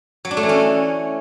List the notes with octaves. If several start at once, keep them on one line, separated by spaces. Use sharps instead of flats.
F#3
D4
A3
E3
C#4